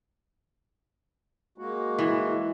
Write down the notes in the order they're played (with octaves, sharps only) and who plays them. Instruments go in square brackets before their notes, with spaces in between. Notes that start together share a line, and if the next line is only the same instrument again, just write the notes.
[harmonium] G#3 A#3 F#4
[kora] E3